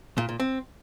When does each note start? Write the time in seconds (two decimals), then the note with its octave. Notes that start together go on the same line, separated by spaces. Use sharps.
0.18 A#2
0.29 A#2
0.40 C4